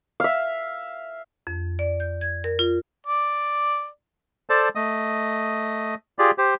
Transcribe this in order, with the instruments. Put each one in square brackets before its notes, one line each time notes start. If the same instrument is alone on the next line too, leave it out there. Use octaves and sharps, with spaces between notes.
[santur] E5 F5
[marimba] F2
D5
G6
G#6
A#4
F4
[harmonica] D5
[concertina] A4 C5 D5 A5
A3 D#5 D#6
F4 G4 G#4 D5
G4 C5